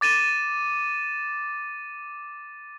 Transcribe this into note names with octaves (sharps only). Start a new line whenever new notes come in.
D6 A6 D#7 E7